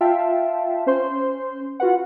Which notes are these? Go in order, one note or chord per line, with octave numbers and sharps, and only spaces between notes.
F4 E5 F5 G5 A5
C#4 C5 C6
F4 F#4 B4 F#5